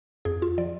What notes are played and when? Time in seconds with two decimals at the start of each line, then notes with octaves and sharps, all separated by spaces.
0.25 F2 G#4
0.42 F4
0.58 F3 D5